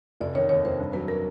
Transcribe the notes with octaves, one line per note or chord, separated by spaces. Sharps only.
F1 D5
D#3 C#5
D#2 C#5
F1 C5
G2
F#3 B4
A#4